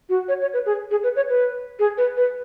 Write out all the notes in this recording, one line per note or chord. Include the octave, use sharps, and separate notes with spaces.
F#4
C#5
C#5
B4
G#4
G#4
B4
C#5
B4
G#4
B4
B4